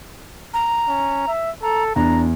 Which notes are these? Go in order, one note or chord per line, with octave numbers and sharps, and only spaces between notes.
A#5
C#4
E5
A4 A#5
E2 D4 A#5